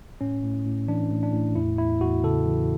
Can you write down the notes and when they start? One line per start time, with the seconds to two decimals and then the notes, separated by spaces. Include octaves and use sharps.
0.21 A2 C#4
0.44 A2
0.65 A2
0.88 E3 D4
1.11 A2
1.23 D4
1.33 A2
1.56 E2 E4
1.78 E2 E4
2.01 E2 F#4
2.24 C#3 A4
2.46 E3